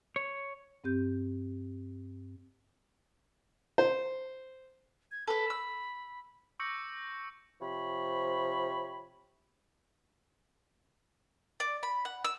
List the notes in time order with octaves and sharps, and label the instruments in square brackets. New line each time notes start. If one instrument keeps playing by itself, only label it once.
[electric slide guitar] C#5
[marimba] G2 C4 G4 G6
[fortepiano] C5
[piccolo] G#6
[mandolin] A4 B4 [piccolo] B5
[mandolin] E6
[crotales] C#6 D6 E6 G6 A#6 C#7
[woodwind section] C3 F3 C#5 B5
[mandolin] D5
B5
F#5
E6